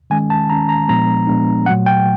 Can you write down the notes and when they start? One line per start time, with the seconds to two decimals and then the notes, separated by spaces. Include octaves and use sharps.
0.10 D#3 G#3 C#4 G#5
0.30 A5
0.50 D#3 G#3 C#4 A#5
0.69 A#5
0.88 A#2 F3 G#3 B3 D4 A#5
1.27 A#2 F3 G#3 B3 D4
1.66 A#2 F#3 A3 F#5
1.86 G5